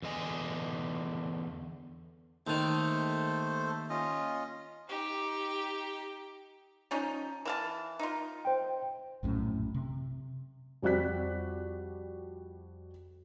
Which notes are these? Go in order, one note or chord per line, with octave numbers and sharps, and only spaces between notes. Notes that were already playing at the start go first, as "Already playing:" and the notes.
E2 D3 D#5 G#5
D#2 D#3 A3 A4 C5
C#4 F4 D#5
D#4 G4
F3 C#4 D#4
E3 F5 A5
D#4 F4
C5 G5
A#1 F#2 A2 C#4
C3
F2 G3 F#4 D5 F#6 B6